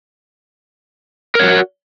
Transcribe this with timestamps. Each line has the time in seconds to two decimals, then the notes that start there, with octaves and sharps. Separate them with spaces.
1.35 A#4
1.39 C#5
1.44 F#4